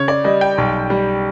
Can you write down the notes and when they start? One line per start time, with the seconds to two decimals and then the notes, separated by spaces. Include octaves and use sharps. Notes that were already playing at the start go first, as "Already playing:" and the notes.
Already playing: C#3 C#5
0.08 D5
0.24 G3 D#5
0.41 G5
0.58 B1
0.90 G3